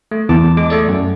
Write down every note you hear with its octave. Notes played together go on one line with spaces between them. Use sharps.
A3
E2 A5 D6
G#3 D6
A3 A4 D5
F#2